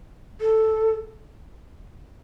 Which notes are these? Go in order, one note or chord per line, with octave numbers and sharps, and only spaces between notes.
A4